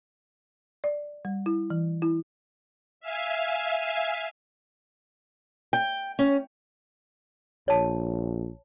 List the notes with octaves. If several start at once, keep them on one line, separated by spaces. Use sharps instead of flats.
D5
G3
E4
E3
E4
E5 F5 G#5
G5
C#4
A#1 C#5 A5